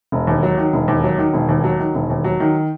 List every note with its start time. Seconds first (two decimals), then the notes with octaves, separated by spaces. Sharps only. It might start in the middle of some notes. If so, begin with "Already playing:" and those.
0.12 E1
0.27 D#2
0.43 F#3
0.58 D#3
0.73 E1
0.88 D#2
1.04 F#3
1.18 D#3
1.34 E1
1.49 D#2
1.64 F#3
1.79 D#3
1.95 E1
2.10 D#2
2.24 F#3
2.40 D#3